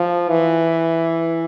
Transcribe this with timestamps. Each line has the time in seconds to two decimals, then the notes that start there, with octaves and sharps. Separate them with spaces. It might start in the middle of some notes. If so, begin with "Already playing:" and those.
Already playing: F3
0.29 E3